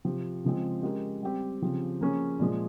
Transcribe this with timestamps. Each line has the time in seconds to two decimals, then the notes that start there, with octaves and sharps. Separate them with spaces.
0.05 C3 F3 C4 G4
0.44 C#3 F3 G#3 C4
0.83 G#3 C#4 G4 A#4
1.23 G3 C4 G4
1.62 C#3 F3 C4 G4
2.01 F3 A#3 C#4 G#4
2.40 A#2 F3 G#3